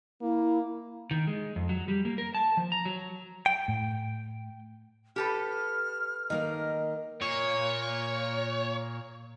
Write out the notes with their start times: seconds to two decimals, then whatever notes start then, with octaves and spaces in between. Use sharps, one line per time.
0.22 A#3 E4
1.11 D#3
1.27 G#3
1.56 F2
1.69 F#3
1.88 G3
2.05 A#3
2.18 A#4
2.35 A5
2.57 F3
2.72 A#5
2.85 F#3
3.46 G5
3.68 A2
5.16 G4 A4 B4 F6
6.30 D#3 A#3 A#4 D#5
7.22 A#2 A#3 C#5